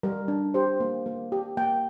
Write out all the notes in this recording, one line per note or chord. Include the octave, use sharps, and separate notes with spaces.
G3 A#4
D4
G4 C5
A#3
A#3
G4
A#3 G5